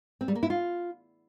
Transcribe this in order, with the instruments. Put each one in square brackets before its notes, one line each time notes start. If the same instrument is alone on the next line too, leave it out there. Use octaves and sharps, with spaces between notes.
[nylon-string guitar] C4
G3
A#3
E4
F4